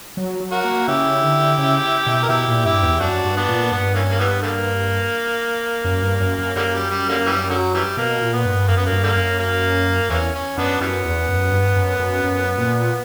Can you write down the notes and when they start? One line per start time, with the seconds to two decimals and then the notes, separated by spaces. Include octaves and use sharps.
0.17 F#3
0.40 F#3
0.52 F#4 A#4
0.65 A#3
0.88 C#3 E4 G4
1.23 D3
1.58 C#3
2.07 B2
2.23 A#4
2.29 B2 E4 G4
2.48 A#2
2.65 G2 E4 G4
2.82 E2
3.00 F#2 D4 F#4
3.25 G2
3.36 B3 D4
3.48 A#2
3.71 G2 B3
3.95 E3 A#3 C#4
4.11 A#3
4.19 E3 G3 B3
4.42 D3 G3 A#3
5.84 F#2
6.02 G2
6.20 F#2
6.38 F#2
6.56 F#2 D3 G3 A#3
6.73 G3
6.91 G3
7.09 D3 G3 A#3
7.26 E3 G3
7.50 D3 F#3
7.74 E3 G3
7.97 B2 A#3
8.21 A#2
8.33 B3
8.45 G2
8.68 F#2 A#3
8.77 B3
8.86 A#3
8.92 G2
9.03 D3 G3 A#3
9.15 F#2
9.39 A#3
10.10 E2 E3 A#3 C#4
10.34 C#4
10.58 F#2 B3 D4
10.81 F#2 E3 G3 B3
11.05 E2
11.29 F#2
11.52 G2
11.76 F#2
11.99 F#2
12.24 F#2
12.58 A#2